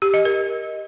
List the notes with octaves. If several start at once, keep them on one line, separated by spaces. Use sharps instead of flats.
G4
D#5
A#4